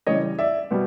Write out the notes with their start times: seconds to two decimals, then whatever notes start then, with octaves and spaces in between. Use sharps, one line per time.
0.07 C#3 E3 G3 C#5 D#5
0.39 D5 E5
0.71 B2 G3 B3